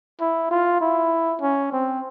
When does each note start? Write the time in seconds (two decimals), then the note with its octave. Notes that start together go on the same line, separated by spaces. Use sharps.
0.20 E4
0.51 F4
0.81 E4
1.41 C#4
1.72 C4